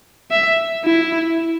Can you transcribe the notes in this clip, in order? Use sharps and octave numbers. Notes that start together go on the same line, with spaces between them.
E5
E4